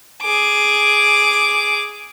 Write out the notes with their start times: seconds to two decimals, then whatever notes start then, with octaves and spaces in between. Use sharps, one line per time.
0.23 G#4 D6